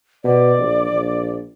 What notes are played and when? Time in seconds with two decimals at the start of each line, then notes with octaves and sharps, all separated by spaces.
0.24 B2 D5
0.58 A#1
0.90 A#1